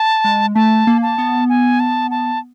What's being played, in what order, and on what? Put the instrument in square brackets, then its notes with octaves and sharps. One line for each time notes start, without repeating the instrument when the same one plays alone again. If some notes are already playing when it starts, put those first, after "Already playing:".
Already playing: [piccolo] A5
[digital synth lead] G#3
[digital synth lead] A3 [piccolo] A5
[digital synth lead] A#3
[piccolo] A5
[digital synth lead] B3
[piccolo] G#5
A5
A5